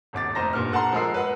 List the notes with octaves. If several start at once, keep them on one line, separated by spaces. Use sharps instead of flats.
D#1 G#1 D6 A6
F1 D#4 C5 A#5 A#6
G2 A#2 B3 F6
A4 F#5 A5 A#5 C6
F3 G#3 A#4 D#5 E6 C7
B4 F#5